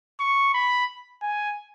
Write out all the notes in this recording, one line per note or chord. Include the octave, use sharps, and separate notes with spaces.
C#6
B5
G#5